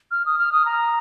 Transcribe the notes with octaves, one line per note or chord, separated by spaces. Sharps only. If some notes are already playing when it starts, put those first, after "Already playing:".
F6
D#6
F6
D#6
A#5